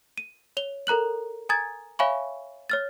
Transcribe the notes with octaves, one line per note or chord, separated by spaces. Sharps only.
D#7
C#5 F7 G7
A4 A#4 A#5 F#6 F#7
G#5 A#5 D#6 G#6 A6
C#5 E5 F5 G#5 B5 C#6
C#5 F6 A6